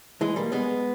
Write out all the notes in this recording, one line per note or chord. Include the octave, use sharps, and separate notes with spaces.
E3 G#3
G3 A#3
G#3 B3